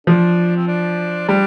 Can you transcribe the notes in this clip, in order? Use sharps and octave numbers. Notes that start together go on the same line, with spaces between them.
F3 D4
C4
D4
G3 D4